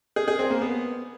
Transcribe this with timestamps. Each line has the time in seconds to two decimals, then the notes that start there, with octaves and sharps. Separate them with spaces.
0.16 G#4
0.28 G#4
0.39 C4
0.50 A#3
0.62 B3